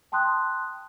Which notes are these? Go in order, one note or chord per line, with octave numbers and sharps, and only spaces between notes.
G5 A5 C6 D#6 F#6